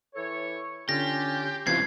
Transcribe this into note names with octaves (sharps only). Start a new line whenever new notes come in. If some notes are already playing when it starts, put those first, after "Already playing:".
E3 A4 C#5
D3 C#4 F4 G4 A#6
C3 E3 G3 B3 C#4 F4 G#6 C7